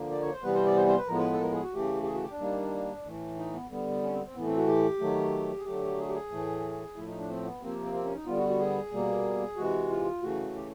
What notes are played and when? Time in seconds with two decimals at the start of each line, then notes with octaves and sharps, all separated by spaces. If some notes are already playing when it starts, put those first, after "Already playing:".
Already playing: D3 F3 A#3
0.11 D5
0.21 C#5
0.32 C5
0.43 C3 E3 G3 B3 B4
0.54 C5
0.65 D5
0.76 C5
0.88 C5
0.98 B4
1.08 A2 F3 G#3 B3 A#4
1.18 B4
1.33 A4
1.41 A#4
1.52 G#4
1.63 F#4
1.74 C#3 E3 A3 G4
2.02 G4
2.07 G#4
2.15 F#4
2.23 G4
2.31 D4
2.39 D#3 G3 A#3
3.05 A2 E3 A3
3.37 D#4
3.53 B3
3.70 D3 G3 B3
4.02 C#4
4.13 C4
4.25 C4
4.35 A2 E3 A3 B3
4.46 C4
4.57 F#4
4.68 G4
5.01 D#3 F#3 A3
5.59 G#4
5.65 D3 F#3 A3 G4
5.98 G#4
6.09 G4
6.14 G#4
6.31 A2 E3 A3
6.96 A2 F3 A3 E4
7.07 D#4
7.18 D4
7.29 C4
7.45 B3
7.61 C3 F3 A#3 C4
7.83 C4
7.94 C4
8.05 C#4
8.15 D#4
8.26 D3 G3 B3 F4
8.37 F#4
8.49 F#4
8.59 G#4
8.92 B2 G3 A#3
9.56 C3 E3 G#3 F#4
9.90 F4
10.22 C#3 E3 A3 F#4
10.55 G4